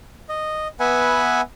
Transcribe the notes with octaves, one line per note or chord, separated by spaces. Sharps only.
D#5
B3 B4 E5 F#5 G#5